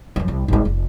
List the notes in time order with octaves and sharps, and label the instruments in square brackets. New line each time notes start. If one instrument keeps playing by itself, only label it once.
[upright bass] F#2 F3
C2
G#1 G#3
F1